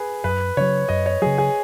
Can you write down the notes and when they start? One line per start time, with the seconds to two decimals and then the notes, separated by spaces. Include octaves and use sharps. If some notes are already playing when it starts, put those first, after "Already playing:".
Already playing: G#4 B4
0.24 F#2 B4
0.57 C#3 F#3 C#5
0.89 F#2 D#5
1.06 C#5
1.22 C#3 F#3 G#4
1.38 G#4